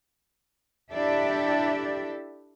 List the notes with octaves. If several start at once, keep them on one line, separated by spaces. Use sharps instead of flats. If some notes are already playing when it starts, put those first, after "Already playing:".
D4 E4 G4 A4 D5 E5